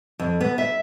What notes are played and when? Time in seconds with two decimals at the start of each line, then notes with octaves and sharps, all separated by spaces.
0.19 F2
0.40 B3
0.58 E5